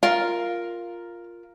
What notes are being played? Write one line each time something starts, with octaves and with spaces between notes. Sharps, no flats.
F4 A#4 F5